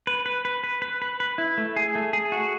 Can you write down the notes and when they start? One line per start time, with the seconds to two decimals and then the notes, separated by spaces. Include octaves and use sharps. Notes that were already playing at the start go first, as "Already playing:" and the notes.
0.07 B4
0.26 B4
0.45 B4
0.64 B4
0.82 B4
1.02 B4
1.20 B4
1.38 E4
1.58 A3
1.76 G#4
1.95 A3
2.13 G#4
2.32 F#4